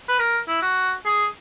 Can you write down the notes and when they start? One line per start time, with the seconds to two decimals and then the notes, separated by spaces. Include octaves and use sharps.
0.09 B4
0.19 A#4
0.48 E4
0.62 F#4
1.06 G#4